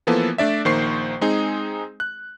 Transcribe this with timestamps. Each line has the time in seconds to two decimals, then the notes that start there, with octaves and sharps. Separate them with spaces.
0.07 E3 F3 A#3 B3 A4
0.38 A3 D4 D5 E5
0.65 A#1 D#3 A#3 C5 C#6 C7
1.21 G#3 C4 D#4 G#4
2.00 F#6